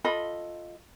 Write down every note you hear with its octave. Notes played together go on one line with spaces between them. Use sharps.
F4 A4 D#5 B5